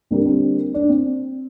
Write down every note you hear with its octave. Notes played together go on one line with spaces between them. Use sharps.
D3 G3 A#3 C4
C4
D4
C4